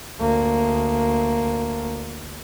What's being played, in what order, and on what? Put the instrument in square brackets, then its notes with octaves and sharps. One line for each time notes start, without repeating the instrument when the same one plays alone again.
[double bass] D2 A#3